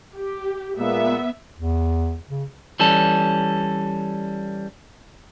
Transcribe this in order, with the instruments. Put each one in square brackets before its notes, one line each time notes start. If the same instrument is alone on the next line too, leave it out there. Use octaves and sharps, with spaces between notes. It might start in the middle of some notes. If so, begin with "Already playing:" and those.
[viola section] G4
[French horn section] A#2 G#3 A#3 [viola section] B3 E5
[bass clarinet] E2
C#3
[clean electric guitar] E3 G3 C#4 A4